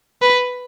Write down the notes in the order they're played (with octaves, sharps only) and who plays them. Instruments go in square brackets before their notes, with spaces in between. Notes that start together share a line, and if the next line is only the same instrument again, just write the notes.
[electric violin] B4